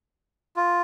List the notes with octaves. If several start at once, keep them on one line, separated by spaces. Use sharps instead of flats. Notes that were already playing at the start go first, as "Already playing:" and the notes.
F4